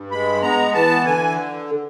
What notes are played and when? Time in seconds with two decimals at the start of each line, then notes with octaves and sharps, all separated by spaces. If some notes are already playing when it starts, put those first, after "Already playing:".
Already playing: G2
0.11 G#3 B5
0.42 B3 A#5
0.74 E3 A5
1.05 D3 G#5